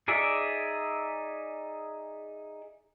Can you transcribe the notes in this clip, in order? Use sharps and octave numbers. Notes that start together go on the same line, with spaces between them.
D#4 G#4 D5 E5